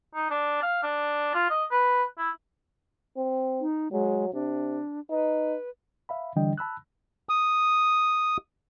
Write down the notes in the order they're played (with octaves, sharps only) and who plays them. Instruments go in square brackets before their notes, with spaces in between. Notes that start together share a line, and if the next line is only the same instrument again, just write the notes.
[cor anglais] D#4
D4
F5
D4
F4
D#5
B4
E4
[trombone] C4
[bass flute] D#4
[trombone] F#3 [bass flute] G#3
[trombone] C3 [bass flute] D4
[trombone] D#4 [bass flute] B4
[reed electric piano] E5 F5 B5
D3 E3 G3 D4 D#5 G5
A5 B5 E6 F#6
[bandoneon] D#6